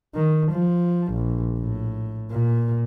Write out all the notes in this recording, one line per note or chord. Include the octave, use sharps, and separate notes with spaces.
D#3
F3
A#1
A2
A#2